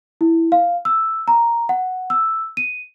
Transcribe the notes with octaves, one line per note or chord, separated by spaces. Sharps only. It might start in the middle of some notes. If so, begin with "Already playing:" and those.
E4
F5
E6
A#5
F#5
E6
D#7